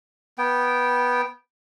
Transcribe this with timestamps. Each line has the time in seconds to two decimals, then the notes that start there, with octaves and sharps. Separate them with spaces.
0.38 B3 G5